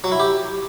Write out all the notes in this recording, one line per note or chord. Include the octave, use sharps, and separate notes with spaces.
F#3
E4
G4